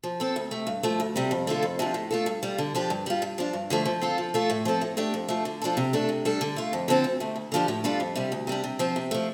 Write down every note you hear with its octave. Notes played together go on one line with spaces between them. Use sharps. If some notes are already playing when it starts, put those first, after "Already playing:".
F3
C4 A4
D2
C3 A3
G2
F3 A3
D2
C3 G3
F2
D3 A3 F4 A4
F2
C3 F3 D4
A2
A3 F4 A4
G2
G3 F4
D3
F3 D4 G4
G2
G3 F4
G2
F3 D4
G2
D3 F3 A3
F3
C4 F4 A4
F3
A3 F4 A4
A2
F3 C4 A4
A2
A3 D4 G4
F2
F3 A3
D3
F3 D4 F4 A4
C3
A3 D4 A4
C3
G3 D4 A4
D3
A3 F4
F2
D3 F3 C4 A4
D2
C3 A3
D2
D3 F3 D4 G4
A2
G3 D4 F4 A4
F2
C3 G3
D2
C3 G3 D4
C3
F3 C4
C3
F3 A3